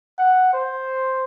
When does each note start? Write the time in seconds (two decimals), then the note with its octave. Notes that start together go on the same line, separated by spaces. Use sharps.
0.19 F#5
0.53 C5